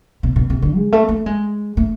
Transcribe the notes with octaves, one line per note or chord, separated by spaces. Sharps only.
B2
B2
C3
D3
G#3
A3
A3
G#3
A3